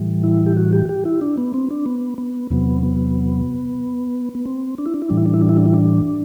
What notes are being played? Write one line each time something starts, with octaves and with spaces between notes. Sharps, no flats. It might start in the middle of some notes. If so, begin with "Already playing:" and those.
Already playing: A2 E3 G3
E4
G4
F#4
G4
G4
E4
D4
B3
C4
D4
B3
B3
E2 C3 F#3 B3
B3
B3
C4
D4
E4
D4
E4
A2 E3 G3 D4
E4
D4
E4
D4
E4
D4
E4
D4